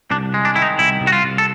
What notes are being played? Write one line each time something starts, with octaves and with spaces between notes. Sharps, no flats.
C2 D4
G#3
D4
D#3 E4
D#4
C2 E4
C2
F#4
F4
C2
A4